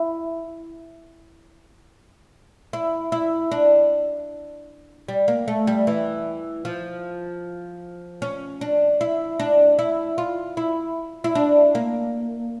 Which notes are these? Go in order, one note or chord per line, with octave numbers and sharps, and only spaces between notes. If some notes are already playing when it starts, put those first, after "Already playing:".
Already playing: E4
E4
E4
D4
G3
A#3
A3
G3
E3
F3
C#4
D4
E4
D4
E4
F4
E4
E4
D4
A#3